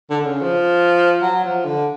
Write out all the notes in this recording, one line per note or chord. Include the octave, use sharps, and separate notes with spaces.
D3
D3
C#3
F3
F#3
F3
D3